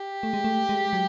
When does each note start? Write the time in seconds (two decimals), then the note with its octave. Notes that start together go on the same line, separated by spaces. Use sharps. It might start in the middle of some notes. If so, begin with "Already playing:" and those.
Already playing: G4
0.23 A3
0.34 G#3
0.44 A3
0.69 G#3
0.93 F#3